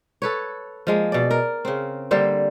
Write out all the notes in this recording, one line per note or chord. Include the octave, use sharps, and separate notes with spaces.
A4 B4 C#5
F3 G#3 A#3
B2 D5
A#4
C#3 C4
D3 G3 A#3 C5